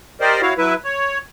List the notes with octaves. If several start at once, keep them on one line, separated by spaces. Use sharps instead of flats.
G4 A#4 C5 D5 D#5
E4 F#4 C#5 F5
F#3 E4 B4 E5
C#5